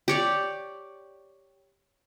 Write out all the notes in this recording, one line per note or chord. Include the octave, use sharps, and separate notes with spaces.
G4 C#5 D5